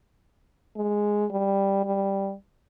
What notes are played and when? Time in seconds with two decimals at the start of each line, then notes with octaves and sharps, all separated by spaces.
0.76 G#3
1.31 G3
1.85 G3